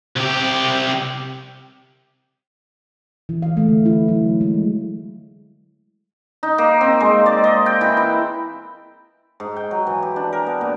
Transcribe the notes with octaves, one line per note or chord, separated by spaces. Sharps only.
C2 G4
E3
F5
A3
D3
E4
F#3
G#3
D#4
A#3
C4
G#3
D5
D#5
G5
E3
E4
G#2
G5
F#3
E3
G4
D4
A#4
B3
A#2